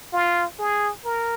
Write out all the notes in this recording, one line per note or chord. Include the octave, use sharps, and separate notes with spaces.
F4
G#4
A#4